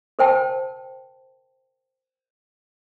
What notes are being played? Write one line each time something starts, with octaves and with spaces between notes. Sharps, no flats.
A#4 C5 G5 A5